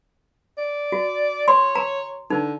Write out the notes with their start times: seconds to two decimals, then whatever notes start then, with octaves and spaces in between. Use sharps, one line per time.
0.58 D5
0.92 F#4
1.48 C#5 C6
1.75 A#5
2.30 D3 D#4